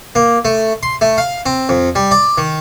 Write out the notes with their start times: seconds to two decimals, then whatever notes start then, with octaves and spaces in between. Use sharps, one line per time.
0.15 A#3
0.45 A3
0.83 C6
1.01 A3
1.18 F5
1.46 C4
1.69 F2
1.95 G3
2.11 D5
2.38 D#3